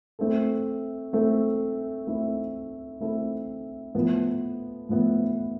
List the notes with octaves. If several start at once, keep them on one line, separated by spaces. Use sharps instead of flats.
A3 C4 E4 A4
A3 C4 E4 A4
A3 C4 E4 A4
A3 C4 E4 A4
A2 F3 B3 E4 B4
A2 F3 B3 E4 B4